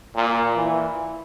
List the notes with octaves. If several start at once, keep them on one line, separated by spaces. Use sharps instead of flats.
A#2
E3